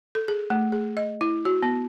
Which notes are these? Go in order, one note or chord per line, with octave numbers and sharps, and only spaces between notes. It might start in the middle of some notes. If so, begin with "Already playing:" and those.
A4
G#4
A3
G#4
D#5
E4
F#4
B3